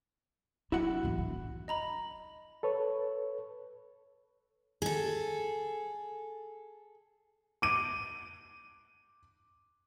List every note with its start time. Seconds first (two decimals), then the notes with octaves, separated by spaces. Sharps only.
0.72 F#3 E4 F#4 F#5
1.03 A1 E2
1.18 D#3
1.68 D#5 A#5 B5
2.63 A4 B4 C#5
4.82 G#4 A4
7.62 D6 D#7